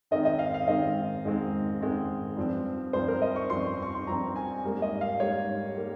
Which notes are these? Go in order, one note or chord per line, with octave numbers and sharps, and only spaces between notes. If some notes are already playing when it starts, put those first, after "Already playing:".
G#2 D#3 G#3 C4 D#5
D#5
F5
F5
G#2 D#3 G#3 C4 D#5
G#2 D#3 G#3 C4
G#2 D#3 G#3 C4
G2 F3 C4
G2 F3 C4 C5
A#4
D#5
C#6
G2 F3 C4 C6
C#6
C6
G2 F3 C4 A#5
G#5
G#2 G3 A#3
D#5
F5
G#2 G3 A#3 C#5
G3 A#3